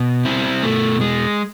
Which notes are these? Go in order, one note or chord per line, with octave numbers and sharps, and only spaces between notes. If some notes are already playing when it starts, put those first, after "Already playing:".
Already playing: B2
C4 E4
B2 A3
G#3